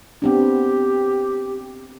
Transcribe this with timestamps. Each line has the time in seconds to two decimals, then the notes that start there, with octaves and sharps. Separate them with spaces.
0.22 B3 C4 D4 G4